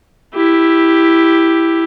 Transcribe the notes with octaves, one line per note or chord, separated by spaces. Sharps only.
E4 G4